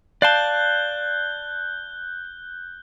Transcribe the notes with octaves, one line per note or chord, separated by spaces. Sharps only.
D5 F5 A5 F#6 G6 G7